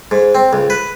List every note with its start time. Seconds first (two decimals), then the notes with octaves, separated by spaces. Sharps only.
0.11 G#2
0.35 C4
0.53 C#2
0.70 B4